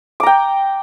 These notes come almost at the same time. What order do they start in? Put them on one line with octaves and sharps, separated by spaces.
D6 A#5 G5